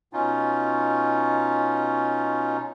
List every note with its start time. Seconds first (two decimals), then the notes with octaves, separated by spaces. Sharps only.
0.13 B2 C#4 D#4 F4